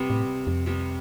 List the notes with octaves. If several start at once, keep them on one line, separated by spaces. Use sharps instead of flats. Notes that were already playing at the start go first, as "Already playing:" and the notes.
Already playing: C3 G3 B3
A2
F2
C3 G3 B3